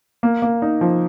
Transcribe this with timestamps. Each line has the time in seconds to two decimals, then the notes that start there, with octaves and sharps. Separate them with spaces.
0.23 A#3
0.42 A#3
0.62 D#4
0.81 F3